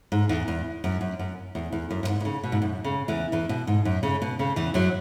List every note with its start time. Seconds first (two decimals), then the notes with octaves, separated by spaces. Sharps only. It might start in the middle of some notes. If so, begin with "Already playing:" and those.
0.12 G#2
0.29 E2
0.48 E2
0.84 F#2
1.01 F#2
1.19 F#2
1.55 E2
1.72 E2
1.91 F#2
2.03 F#2
2.08 G#2
2.20 B2
2.25 C#3
2.43 B2
2.52 G#2
2.62 F#2
2.84 C#3
3.08 E2 E3
3.32 E2 E3
3.49 B2
3.67 G#2
3.85 F#2
4.03 C#3
4.22 B2
4.39 C#3
4.56 E2 E3
4.74 F#2 F#3